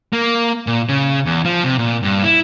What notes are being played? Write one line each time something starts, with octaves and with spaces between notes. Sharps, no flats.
A#3
A#2
C#3
E2
F3
C3
A#2
G2
E4